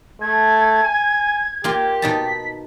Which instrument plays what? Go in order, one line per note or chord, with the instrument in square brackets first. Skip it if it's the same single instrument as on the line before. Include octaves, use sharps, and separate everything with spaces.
[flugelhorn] A3 [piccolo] G#6
[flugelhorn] G#5
[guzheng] A#3 F4 [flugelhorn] G4
[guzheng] B2 D#4 A5 [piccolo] B6